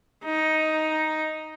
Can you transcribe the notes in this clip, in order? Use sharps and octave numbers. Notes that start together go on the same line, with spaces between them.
D#4